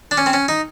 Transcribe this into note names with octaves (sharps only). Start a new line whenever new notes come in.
D4
C#4
C4
C#4
D#4